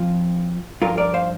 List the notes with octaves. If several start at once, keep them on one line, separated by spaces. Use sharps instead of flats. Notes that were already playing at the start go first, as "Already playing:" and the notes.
Already playing: F2 F3 F4
G2 F3 F4 A#4
A#4 D5
C5 F5